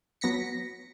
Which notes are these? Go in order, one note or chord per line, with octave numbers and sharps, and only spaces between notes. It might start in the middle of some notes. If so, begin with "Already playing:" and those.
F#3 B3 A#6 B6 C#7